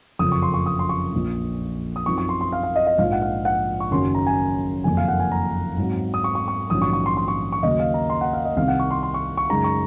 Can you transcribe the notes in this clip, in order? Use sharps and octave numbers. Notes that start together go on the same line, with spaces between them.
F#1 F2 C#3 F3 D#6
C#6
C6
C#6
D#6
C6
C#6
A#1 A#2 F3
D#6
F#2 F3 C4 D#4 C#6
C#6
C6
C6
F5
F5
D#5
D#5
A#1 G#2 F3 F5
F#5
F5
F#5
C#6
F#1 F#2 D#3 F#3 C#4 C6
A#5
G#5
F#1 F2 D#3 A#3 D#4 G#5
F5
F#5
G#5
A#5
G#2 F#3 C4
D#6
C#6
C#6
C#6
A#1 G#2 D#3 F#3 C#4 D#6
C#6
C#6
C6
C6
C#6
C#6
D#2 C#3 F#3 A#3 D#5
F5
A#5
C6
F#5
F5
D#5
C2 C3 D#3 F5
F#5
C#6
C6
C6
C#6
C#6
F#2 C#3 G#3 D#4 A#5
C#6